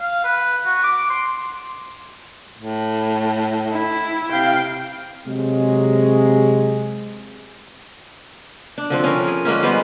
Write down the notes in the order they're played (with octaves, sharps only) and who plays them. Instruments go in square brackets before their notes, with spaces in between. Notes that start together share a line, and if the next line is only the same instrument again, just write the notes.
[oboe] F5
B4
F#4
D6
C6
[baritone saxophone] A2
[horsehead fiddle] E4
[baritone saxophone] C3 [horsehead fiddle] F5 G5
[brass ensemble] C3 F#3 G#3
[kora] D4
D3 F3 C4
C#4 A#4
G#4
D3 G#3 A#3 C#4
G3 G#3 B3 C5